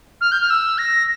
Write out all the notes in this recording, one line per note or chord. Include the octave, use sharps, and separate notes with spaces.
F6
G6
F6
E6
A#6